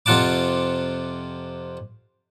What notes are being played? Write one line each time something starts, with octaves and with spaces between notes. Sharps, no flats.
F2 C3 F4 F#5 A5 D6